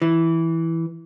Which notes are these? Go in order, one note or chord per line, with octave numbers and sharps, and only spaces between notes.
E3